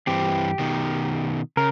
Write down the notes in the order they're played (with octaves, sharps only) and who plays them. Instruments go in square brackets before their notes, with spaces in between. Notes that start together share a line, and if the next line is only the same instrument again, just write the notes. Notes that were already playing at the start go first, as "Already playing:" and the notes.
[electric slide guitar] G2 E3 C4 [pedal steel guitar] G4
[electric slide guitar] B2 D#3
[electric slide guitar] C#3 [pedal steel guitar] A#4